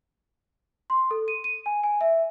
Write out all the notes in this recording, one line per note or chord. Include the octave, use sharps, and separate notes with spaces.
C6
A4
D#7
D#7
G#5
G#5
E5